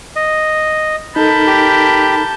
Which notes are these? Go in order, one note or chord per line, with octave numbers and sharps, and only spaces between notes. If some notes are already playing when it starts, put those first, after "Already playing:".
D#5
D#4 A4 A#4 A5 B5 G6
G4